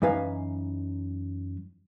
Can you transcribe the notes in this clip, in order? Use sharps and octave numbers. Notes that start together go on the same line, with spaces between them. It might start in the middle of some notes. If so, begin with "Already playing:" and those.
F#2 E3 D#4 B4 F5 G#5